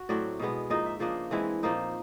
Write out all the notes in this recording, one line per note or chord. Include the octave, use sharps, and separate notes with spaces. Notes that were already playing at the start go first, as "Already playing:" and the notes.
Already playing: F#4
A2 F#3 A3 C4 D5
B2 G#3 B3
G#2 F3 A#3 D#4 D#5
E5
C#3 F3 A#3 D4 D#5
E3 G#3 C4 E4
A#2 F3 A#3 D#4